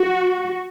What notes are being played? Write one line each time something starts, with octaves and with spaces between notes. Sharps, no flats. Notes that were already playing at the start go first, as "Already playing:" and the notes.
Already playing: F#4